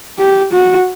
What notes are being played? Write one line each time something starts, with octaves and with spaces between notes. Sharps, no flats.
G4
F#4